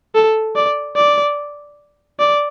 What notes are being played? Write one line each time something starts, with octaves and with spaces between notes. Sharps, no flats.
A4
D5
D5
D5